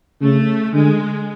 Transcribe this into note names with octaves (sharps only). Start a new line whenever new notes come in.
C#3 A3
D3 G#3